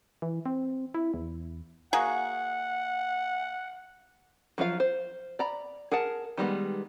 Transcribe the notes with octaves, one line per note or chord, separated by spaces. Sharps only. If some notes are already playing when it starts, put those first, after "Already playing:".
E3
C4
E4
E2
A#3 F#4 G#4 F#5
F3 F#3 F4 F5
C5
D5 A#5 B5
G#4 A#4 F#5 A5
D#3 G3 G#3 B3